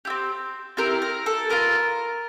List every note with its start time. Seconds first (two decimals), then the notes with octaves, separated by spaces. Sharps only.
0.05 E4 G4
0.10 C4
0.77 C4 E4 G4 A#4
1.02 A#4
1.26 A4
1.49 B3 D4 F4 A#4